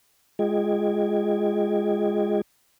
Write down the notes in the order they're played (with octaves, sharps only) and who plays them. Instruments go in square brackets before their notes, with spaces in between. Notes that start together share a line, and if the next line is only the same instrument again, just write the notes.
[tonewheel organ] G#3 F4 G#4 D#5 G5 G#6